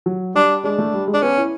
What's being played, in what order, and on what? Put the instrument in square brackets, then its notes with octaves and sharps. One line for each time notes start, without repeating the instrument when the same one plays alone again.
[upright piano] F#3
[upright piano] G3 [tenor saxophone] D4
[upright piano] G#3 [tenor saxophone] D4
[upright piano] A3
G3
G#3
[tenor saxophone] D4
[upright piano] B3 [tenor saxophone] C#4
[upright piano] E4